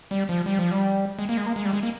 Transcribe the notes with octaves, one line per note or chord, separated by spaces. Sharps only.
G3
F3
G3
F3
G3
G#3
A#3
G#3
A#3
G#3
G3
G#3
A#3